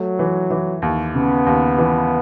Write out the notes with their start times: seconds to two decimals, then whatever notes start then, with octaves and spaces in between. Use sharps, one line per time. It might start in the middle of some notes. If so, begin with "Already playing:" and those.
Already playing: F#3 A3
0.19 E3
0.50 E3
0.82 D#2
1.15 C#3 B3
1.46 D#2
1.78 E3